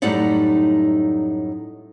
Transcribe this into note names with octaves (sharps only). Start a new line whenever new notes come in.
F#2 A2 G3 D#4 D5 F#5